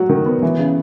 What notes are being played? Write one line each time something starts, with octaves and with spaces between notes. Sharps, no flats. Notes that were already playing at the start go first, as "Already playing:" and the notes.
Already playing: F#3 F#4
D#3
B3
E3
C#3